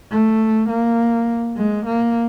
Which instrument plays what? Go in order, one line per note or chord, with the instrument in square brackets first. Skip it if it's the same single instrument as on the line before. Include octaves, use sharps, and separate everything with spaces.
[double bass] A3
A#3
G#3
A#3